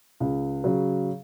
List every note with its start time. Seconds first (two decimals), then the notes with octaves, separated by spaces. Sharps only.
0.20 C#2
0.64 C#3 F#3